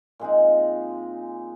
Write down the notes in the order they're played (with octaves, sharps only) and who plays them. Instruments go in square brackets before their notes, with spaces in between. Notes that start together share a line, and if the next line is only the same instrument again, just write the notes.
[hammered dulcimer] A#2 G#3 C4 D#4